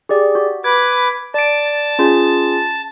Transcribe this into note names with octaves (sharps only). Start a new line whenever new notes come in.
G4 G#4 D5
F#4
B4 D6 G#6
D5 A5 D7
C#4 F4 G#4